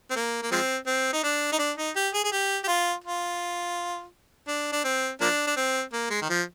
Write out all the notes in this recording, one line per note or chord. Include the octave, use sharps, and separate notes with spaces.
C4
A#3
A#3
F3 G#3 C4
C4
D#4
D4
D#4
D4
D#4
G4
G#4
G#4
G4
G4
F4
F4
D4
D4
C4
F3 A#3 D4
D4
C4
A#3
G#3
D#3
F3